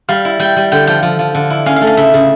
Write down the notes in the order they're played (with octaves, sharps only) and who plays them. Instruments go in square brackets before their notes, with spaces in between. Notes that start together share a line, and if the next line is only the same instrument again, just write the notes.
[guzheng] G3 [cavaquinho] F5
[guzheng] E4
[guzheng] G3 [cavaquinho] G5
[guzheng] G3
[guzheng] D3 [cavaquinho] G5
[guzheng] F3 [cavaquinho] G5
[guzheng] F3
F3
D3
E4
[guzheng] C#4 [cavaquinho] F5
[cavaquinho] F5
[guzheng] A3
[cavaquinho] F5
[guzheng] C#3 [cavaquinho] E5
[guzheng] C#3